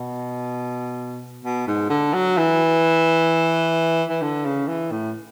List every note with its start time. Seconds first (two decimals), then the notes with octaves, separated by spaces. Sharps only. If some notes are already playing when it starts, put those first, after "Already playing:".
Already playing: B2
1.45 B2
1.67 G#2
1.90 D3
2.14 F#3
2.37 E3
4.10 E3
4.22 D3
4.45 C#3
4.68 E3
4.91 A2